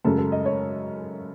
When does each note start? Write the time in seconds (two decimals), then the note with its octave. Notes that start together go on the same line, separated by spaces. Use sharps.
0.04 F#2 C#3 G#3 A4
0.18 A4
0.32 D#5
0.45 C#5